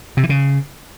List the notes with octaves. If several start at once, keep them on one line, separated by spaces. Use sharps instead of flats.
C3
E3
C#3